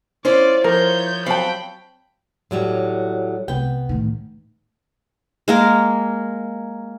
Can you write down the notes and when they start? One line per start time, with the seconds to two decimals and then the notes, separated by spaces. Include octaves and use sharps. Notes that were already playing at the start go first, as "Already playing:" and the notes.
0.25 C#4 E4 F4 C5 D5
0.64 F3 A#4 C#5 G6
1.26 F#3 C4 F5 G5 A5 B5
2.51 A2 F#3 G3
3.48 C2 G#3 B3 G5
3.89 A2 D#3
5.48 G#3 A#3 A#4